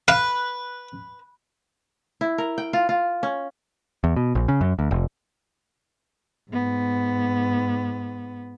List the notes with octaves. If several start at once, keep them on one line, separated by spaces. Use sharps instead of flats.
B4 F5
E4
A#4
G5
F4
F4
C#4
E2
B2
A#1
C#3
F#2
D2
F1
G#2 B3